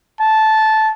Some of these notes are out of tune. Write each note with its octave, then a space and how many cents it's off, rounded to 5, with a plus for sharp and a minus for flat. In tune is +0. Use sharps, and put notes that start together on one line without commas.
A5 -10